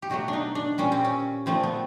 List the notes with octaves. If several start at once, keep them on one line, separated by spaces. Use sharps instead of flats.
G4
B2 F#3 A3 F#4
D4
D#4
D4
A#2 G3 C#4
C4
C#4
A#2 F3 A3 C4
B3